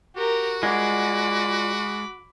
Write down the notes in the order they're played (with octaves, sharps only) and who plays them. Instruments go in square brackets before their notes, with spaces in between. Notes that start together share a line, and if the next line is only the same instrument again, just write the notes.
[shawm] F#4 [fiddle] G4 A#4
[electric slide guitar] G#3 [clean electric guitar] F4 D5 F#5 [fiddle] B5 D6